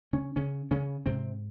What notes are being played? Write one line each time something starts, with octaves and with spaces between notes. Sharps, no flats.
C#3 C#4
C#3 C#4
C#3 C#4
G#2 C3 C4